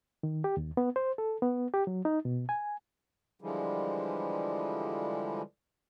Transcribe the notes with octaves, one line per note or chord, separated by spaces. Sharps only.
D#3
G4
D#2
B3
C5
A4
B3
G4
F#3
D#4
B2
G#5
D3 E3 F3 G3 G#3